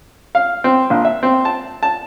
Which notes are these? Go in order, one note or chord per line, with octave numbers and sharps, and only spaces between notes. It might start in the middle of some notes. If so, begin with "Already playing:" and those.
F5
C4
A#1
E5
C4
A5
A5